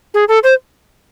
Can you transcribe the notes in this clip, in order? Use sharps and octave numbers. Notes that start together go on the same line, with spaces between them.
G#4
A4
C5